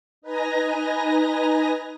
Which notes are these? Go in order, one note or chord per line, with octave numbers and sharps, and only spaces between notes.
D#4 B4 D#5 G#5 A#5 A#6